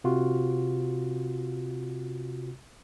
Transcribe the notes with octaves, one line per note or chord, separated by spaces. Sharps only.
C3 F4 F#4